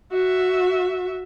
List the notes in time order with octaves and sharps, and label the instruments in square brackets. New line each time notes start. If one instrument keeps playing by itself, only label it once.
[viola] F#4 E5